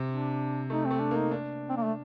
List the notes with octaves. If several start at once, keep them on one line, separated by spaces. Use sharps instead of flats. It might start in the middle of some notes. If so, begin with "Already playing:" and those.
Already playing: C3
D4
A3 D#4
C4
A3
D4
A#3 D#4
D4
C4
A#3
A3